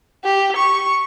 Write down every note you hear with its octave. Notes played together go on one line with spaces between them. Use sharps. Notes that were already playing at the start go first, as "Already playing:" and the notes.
G4
C#6